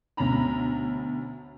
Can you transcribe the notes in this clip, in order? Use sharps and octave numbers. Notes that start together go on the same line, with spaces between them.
D2 B2 C#4 A#5 B5